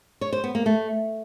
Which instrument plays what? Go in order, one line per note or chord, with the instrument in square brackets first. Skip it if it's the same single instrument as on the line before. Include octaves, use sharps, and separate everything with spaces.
[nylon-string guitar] C#5
C5
B3
A#3
A3